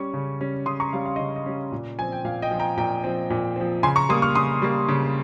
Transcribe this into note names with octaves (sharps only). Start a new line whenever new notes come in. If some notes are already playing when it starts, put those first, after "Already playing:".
Already playing: G3 C#4 C#6
C#3
G3 C#4
C#3 C6 D#6
A#5 C#6
G3 C#4 F5
F5
C#3 D#5
D#5
G3 C#4
A#2
F3 C4 G#5
G5
A#2 F5
D#5 G5
F3 C4
G5 A#5
A#2 G5 A#5
F3 C4
A#2
F3 C4
C#3 G#5 C6
A#5 C#6
G3 A#3 C6 D#6
C#6 F6
C#3 C6 D#6
G3 A#3
C#3